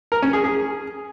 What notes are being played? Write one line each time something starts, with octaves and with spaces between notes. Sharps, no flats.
A#4
C#4
G#4
G#4